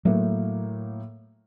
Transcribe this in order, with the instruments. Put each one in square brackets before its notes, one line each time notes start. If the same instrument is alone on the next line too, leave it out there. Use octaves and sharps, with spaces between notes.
[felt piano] A2 A3 A#3 [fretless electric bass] F#3